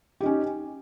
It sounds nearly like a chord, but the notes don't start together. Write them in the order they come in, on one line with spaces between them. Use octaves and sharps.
G4 D#4 C#4